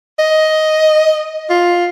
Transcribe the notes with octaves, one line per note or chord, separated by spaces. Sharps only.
D#5
F4